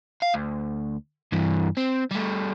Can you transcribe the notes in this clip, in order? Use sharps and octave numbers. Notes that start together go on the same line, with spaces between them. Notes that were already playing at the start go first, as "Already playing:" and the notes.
F5
D2
G2 E3
C4
G3 A3